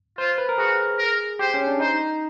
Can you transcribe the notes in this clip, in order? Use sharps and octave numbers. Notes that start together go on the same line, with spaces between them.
F4 C5
B4
A#4
F#4 G#4
A#4
G4 C5
C#4
D4
D#4 C5